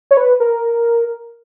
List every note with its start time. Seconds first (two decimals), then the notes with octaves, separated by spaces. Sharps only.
0.11 C#5
0.17 B4
0.40 A#4